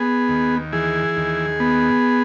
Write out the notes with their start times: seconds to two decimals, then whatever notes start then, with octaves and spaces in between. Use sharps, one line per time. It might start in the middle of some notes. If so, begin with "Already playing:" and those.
Already playing: B3 G#4
0.29 D#2
0.73 E3 G#4
1.17 D#2
1.60 B3